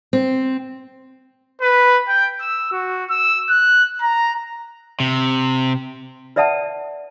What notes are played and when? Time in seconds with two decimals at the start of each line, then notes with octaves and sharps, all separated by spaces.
0.13 C4
1.61 B4
2.09 G5
2.41 E6
2.72 F#4
3.10 E6
3.49 F#6
4.02 A#5
5.00 C3
6.36 B4 D5 E5 F#5 A5